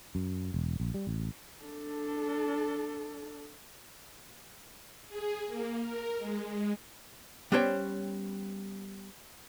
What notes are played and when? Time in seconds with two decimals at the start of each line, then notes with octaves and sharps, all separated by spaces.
0.15 F#2
0.54 E1
0.80 A#1
0.94 G3
1.07 A1
1.63 D4 A4
5.09 G#4
5.47 A#3
5.80 A#4
6.18 G#3
7.52 G3 B3 C#4 C5 C#5 G5